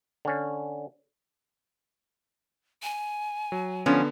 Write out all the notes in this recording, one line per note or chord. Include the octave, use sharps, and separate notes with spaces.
D3 C#4
G#5
F#3
D3 F3 B3 C#4